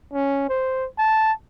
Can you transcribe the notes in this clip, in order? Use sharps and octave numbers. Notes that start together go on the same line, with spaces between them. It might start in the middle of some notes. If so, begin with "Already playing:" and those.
C#4
C5
A5